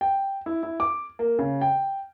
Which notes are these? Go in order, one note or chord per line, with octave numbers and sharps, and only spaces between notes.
G5
E4
E4
D6
A#3
C#3
G5